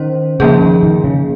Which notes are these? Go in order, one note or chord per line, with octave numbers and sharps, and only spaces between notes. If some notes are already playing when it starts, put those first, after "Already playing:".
Already playing: D#3 C#4 C5
C#3 F3 A#3 C#4 G#4
D#3
D#3
C#3